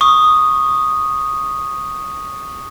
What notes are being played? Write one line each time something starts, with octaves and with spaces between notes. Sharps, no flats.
C#6 D#6